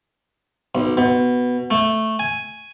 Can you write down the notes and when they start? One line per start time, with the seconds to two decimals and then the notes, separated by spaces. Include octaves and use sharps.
0.75 B1
0.97 B2
1.71 A3
2.19 G#5